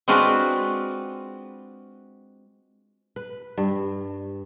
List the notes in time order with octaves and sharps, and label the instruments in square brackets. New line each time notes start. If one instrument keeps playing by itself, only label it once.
[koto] G#3 C4 D4 F4 F#4 B4
[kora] B4
G2